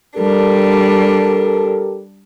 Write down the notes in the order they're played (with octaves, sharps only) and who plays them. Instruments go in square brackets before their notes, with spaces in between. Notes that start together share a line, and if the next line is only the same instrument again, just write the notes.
[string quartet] G3 D4 [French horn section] G4 A4 A#4